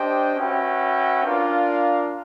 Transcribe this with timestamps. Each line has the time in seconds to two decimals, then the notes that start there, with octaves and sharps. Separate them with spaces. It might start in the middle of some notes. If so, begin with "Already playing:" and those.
Already playing: D4 G4 C5 D#5 G5
0.36 C#4 F#4 B4 E5 G5
1.24 D4 F4 A#4 D5 F5